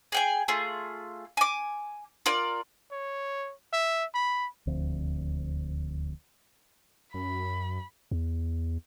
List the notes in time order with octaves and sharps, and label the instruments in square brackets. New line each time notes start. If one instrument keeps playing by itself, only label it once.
[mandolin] G#4 G5 G#5
A3 F4 G#4
G#5 D6
F4 A#4 D5
[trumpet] C#5
E5
B5
[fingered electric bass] D#1 D2 F3 C4
[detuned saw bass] F#2 [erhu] B5
[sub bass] E2